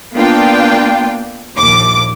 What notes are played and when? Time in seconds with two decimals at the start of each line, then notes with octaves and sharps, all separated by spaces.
0.14 A#3 B3 D4 F4 G5
1.57 A#1 D#2 D6